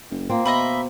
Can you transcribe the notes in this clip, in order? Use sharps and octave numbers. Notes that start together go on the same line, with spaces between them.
F#1
A#2 A#3 C4
B2 D#5 E5 B5